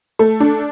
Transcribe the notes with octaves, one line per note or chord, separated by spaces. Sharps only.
A3
D4